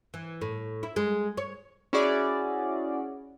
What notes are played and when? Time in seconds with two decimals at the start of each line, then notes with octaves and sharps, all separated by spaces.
0.14 E3
0.41 A2
0.83 E4
0.96 G#3
1.37 C#5
1.93 C#4 E4 F#4 G#4 D5